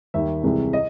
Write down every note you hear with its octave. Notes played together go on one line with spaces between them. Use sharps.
D#2 D#3 G3 E5
C2 C3 E3 G#3
D#5